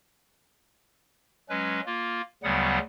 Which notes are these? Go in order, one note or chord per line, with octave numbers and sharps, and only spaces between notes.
F#3 G#3 C#4 B4
A#3 F4
D2 C#3 F#3 G3 B3 F#5